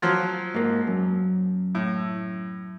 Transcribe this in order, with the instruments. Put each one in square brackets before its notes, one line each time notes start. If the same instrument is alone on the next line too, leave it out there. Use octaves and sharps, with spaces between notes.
[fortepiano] F3 F#3 F4
[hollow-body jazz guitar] G#2 A#3
F#2
[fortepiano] A2